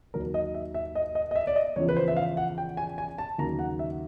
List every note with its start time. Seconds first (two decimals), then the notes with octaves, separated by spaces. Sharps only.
0.14 D#2 D#3 F#3 A#4
0.34 D#5
0.54 E5
0.74 E5
0.95 D#5
1.15 D#5
1.31 D#5
1.36 E5
1.47 D5
1.56 D#5
1.76 E2 C#3 F3 C#5
1.89 B4
1.97 C5
2.08 E5
2.17 F5
2.37 F#5
2.58 G5
2.77 G#5
2.98 G#5
3.18 A5
3.38 D#2 C#3 F#3 A#5
3.59 F#5
3.79 E5